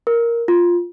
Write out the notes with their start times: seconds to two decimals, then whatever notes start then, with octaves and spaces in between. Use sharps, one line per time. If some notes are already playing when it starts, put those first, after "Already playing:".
0.07 A#4
0.48 F4